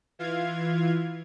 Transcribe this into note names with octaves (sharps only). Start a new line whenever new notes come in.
E3 F4 F5 G#6